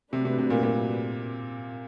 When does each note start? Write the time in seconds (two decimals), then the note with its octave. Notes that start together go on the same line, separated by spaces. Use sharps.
0.12 C3 F#3 A3 D4 G4 B4
0.25 C3
0.38 C3
0.50 A#2
0.63 A#2